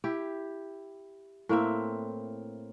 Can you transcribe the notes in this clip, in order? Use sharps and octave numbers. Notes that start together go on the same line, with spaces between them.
E4 G4
A2 A#3 C4 E5